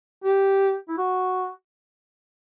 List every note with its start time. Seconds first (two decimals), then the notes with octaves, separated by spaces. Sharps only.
0.24 G4
0.89 E4
0.98 F#4